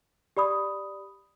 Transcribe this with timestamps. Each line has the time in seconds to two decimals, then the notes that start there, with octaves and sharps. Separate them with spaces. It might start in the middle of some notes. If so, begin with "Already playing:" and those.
0.37 G4 D5 B5 D#6